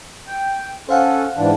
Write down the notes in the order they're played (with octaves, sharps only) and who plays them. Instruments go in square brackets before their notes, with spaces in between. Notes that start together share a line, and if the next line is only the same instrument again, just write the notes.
[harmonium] G5
[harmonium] C#4 A4 [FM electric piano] C5 F5 F#5
[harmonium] G#2 E3 D4